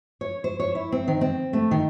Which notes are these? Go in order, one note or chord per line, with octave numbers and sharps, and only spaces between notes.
C#5
C5
C#5
E4
C4
D#3
C4
A3
D#3